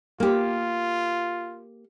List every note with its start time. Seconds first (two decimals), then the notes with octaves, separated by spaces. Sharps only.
0.20 A#3 F4 G4